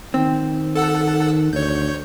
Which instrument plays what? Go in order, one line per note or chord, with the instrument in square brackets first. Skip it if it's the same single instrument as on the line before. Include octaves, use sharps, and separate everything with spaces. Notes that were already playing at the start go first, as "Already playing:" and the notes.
[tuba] D#3 [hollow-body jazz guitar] C4
[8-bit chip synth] A4 F#5 E6
[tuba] D2 [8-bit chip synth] C#5 G6